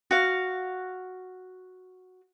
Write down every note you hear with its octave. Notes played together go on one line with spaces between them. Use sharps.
F#4 F5